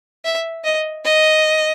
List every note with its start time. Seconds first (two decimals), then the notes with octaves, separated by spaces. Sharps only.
0.25 E5
0.64 D#5
1.05 D#5